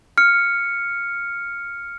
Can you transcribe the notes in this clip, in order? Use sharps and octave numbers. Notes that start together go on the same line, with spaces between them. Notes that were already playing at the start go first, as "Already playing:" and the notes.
F6 C#7